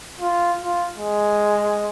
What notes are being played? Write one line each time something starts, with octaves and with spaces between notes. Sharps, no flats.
F4
F4
G#3